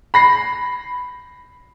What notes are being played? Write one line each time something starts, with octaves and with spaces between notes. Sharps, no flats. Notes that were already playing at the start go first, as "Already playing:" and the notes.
B5 A#6 C7